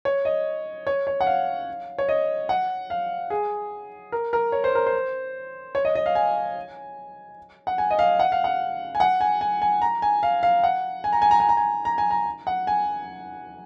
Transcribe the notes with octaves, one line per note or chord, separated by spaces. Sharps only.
C#5
D#5
C#5
C#5
F#5
F5
C#5
D#5
F#5
F5
G#4
A#4
A#4
C#5
C5
A#4
C5
C#5
D#5
D#5
F5
G#5
F#5
G#5
D#5
F5
F#5
F5
F#5
G#5
F#5
G#5
G#5
G#5
A#5
G#5
F5
F5
F#5
G#5
A#5
G#5
A#5
G#5
A#5
G#5
A#5
G#5
A#5
F#5
G#5